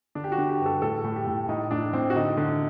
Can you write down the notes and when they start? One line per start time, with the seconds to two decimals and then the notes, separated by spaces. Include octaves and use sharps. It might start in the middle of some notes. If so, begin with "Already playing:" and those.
0.15 D3 D4
0.24 G4
0.32 F#4
0.38 D3
0.49 G4
0.60 G2
0.66 A4
0.82 A2 A4
1.04 A2
1.16 G4
1.27 A2
1.49 A2 D#4
1.71 A2 D4
1.93 A2 C4
2.10 F#4
2.16 D3 D#4
2.37 D3